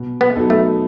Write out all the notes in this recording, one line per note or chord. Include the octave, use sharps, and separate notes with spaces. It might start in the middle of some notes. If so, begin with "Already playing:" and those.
Already playing: B2
B3
F#3 B3 D#4 A4
A3